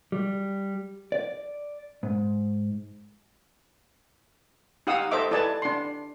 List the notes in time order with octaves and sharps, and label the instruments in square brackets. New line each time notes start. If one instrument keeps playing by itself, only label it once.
[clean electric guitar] G3
D5
G#2
[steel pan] D#4 G4 F5 F#5 D#6 E6
A4 C5 D#5 E5 D6
E4 A4 B4 D5 G#5 A5
D4 C6